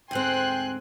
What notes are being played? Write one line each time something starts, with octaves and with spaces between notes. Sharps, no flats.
D2 G#2 C4 G5 G#5 C6 F#6